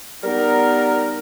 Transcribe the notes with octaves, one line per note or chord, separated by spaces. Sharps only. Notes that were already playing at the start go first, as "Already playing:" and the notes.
G3 B3 D#4 A#4